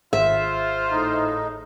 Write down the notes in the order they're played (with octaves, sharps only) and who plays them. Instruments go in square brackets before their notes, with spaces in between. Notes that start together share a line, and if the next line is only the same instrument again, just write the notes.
[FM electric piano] G#1 [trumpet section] F4 C5 [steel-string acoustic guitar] E5
[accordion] A2 D#4